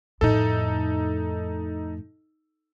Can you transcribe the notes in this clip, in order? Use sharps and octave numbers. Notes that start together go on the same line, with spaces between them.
F2 A2 D#4 A4